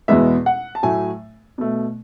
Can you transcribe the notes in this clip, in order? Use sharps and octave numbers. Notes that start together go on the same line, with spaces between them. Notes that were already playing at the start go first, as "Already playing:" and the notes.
E2 B2 G#3 B3 E5
F#5
A5
A2 F#3 A3 G#5
B2 A3